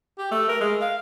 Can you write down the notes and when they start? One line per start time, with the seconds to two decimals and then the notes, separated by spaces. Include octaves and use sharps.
0.18 G4
0.31 A3
0.49 A#4
0.61 G#3
0.81 F5